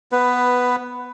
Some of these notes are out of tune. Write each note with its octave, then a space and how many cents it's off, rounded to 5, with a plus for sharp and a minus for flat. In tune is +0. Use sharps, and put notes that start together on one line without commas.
B3 +0 B4 +10